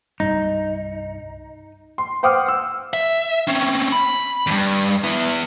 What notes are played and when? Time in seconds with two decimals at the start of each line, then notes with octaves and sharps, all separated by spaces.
0.20 C2 G2 G3 D#4
1.98 C6
2.23 C5 F#5 G5 D6 D#6 F6
2.48 E6
2.93 E5
3.47 C4 C#4
3.92 B5
4.47 E2 G2
5.04 B3 E4